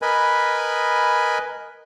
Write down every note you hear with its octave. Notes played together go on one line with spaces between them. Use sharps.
A#4 B4 D#5 G#5 B5